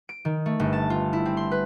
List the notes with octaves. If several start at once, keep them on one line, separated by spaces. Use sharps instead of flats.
D7
D#3
A3
G1
A5
F4
E4
C4
C6
B4